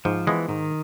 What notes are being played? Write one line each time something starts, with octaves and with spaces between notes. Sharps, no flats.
G#2 F3
E3 F3 G#3 B3
G#2 D#3